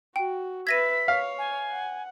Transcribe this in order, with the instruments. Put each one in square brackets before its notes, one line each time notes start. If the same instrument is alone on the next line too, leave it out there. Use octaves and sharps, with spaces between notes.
[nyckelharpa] F#4 [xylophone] G5
[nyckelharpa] B4 E5 [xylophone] G#6 A#6 D#7 [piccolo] B6
[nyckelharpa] C#5 [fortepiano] F5
[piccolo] G#5
[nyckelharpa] F#5